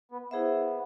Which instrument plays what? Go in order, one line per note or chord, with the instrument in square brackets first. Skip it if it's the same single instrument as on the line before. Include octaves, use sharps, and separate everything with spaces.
[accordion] B3
[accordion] B3 [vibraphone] E4 G#4 C5 E5